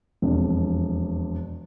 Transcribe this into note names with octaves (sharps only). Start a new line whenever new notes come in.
E1 F2